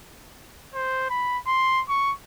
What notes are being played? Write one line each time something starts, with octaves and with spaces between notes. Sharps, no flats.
C5
B5
C6
C#6